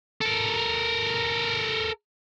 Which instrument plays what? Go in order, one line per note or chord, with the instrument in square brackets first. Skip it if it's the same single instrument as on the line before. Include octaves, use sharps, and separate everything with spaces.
[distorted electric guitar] A4 A#4